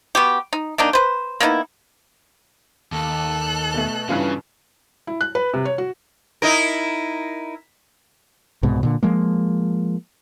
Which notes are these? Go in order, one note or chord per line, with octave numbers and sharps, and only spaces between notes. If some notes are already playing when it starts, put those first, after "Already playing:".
B3 F#4 G4
D#4
D#3 A#3 D4 D#4
B4 C5
A#3 B3 D#4 E4
D#2 A4 F#6
B2 A3
G2 C#3 E3 F4
E4
F#6
B4
C3
C#5
F#4
D#4 E4 A#4
C2 G#2 B2
A#2 D3
F3 G#3 A#3